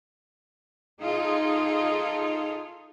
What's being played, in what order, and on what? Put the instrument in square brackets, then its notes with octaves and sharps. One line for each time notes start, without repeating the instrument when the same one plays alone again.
[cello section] D#4 F4 G#4 A4